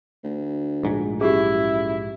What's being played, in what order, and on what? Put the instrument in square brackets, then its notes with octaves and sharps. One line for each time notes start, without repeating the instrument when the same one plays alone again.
[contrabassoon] D2
[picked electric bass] A#1 G#2
[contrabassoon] F#2 [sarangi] E4 [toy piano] G4 G#4